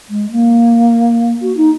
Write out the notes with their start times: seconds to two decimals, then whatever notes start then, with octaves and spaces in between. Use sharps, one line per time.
0.10 G#3
0.31 A#3
1.42 F#4
1.57 D#4